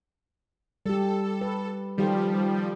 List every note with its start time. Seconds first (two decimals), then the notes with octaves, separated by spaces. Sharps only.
0.86 G3 G4 A4
1.41 B4
1.98 D#3 F3 G3 G4 A4